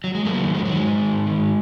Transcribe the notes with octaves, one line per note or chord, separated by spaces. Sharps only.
F#3
G#3
F2 F#3 A#3
D#3
F2 G#3
D#3 F#3
G#3
G#2
D#3
G#2
D#3